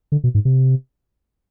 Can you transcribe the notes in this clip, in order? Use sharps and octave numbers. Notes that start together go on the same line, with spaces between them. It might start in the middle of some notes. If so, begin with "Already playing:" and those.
D3
B2
G#2
C3